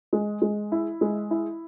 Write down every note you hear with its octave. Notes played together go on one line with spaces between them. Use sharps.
G#3
G#3
E4
G#3
E4